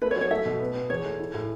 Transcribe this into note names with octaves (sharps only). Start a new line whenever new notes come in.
A3 B4
C#5
F#3
C#5
A3 E5
B2
B3
B3
E2 C#5
A3
E4
A2